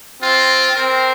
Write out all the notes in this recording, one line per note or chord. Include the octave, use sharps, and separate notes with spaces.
C4 F4
C4 A#4